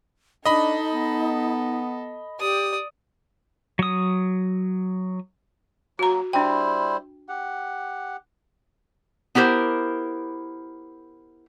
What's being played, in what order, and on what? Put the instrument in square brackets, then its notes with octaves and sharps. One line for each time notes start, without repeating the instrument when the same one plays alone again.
[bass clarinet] D4 [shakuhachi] D#4 [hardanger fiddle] A4 [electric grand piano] D#5 B5
[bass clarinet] B3
[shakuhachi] G4 [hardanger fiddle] D5 D#6
[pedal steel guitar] F#3 D#6
[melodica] F#3 A#3 [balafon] F#4 A#5
[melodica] G3 E4 C5 [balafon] D4 G5
[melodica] G4 F#5
[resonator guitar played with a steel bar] B3 E4 G4 A#4 C5